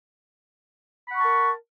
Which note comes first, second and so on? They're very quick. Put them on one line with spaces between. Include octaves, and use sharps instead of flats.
B5 F#5 C#6 A5 A#4